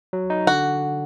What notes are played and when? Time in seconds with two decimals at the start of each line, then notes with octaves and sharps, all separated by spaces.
0.13 F#3
0.30 D#4
0.47 D3 F#4